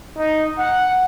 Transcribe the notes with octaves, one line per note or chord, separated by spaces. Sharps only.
D#4
F#5